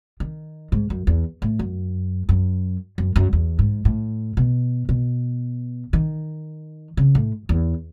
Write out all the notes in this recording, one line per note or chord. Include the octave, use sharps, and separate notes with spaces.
D#3
G#2
F#2
E2
A2
F#2
F#2
F#2
F#2
E2
G#2
A2
B2
B2
D#3
C#3
A2
E2